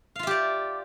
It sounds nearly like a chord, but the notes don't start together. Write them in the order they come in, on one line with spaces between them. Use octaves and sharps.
F5 F4 E5 G4 D5